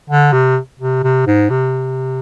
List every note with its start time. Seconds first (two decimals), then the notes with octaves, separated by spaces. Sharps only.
0.10 D3
0.33 C3
0.79 C3
1.04 C3
1.27 G#2
1.50 C3